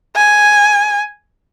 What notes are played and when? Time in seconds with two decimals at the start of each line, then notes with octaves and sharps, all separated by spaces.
0.16 G#5